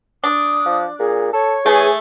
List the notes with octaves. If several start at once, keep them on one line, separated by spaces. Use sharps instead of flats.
D4 D#6
F3
A#2 G#4
A4 C#5
E3 A3 G#4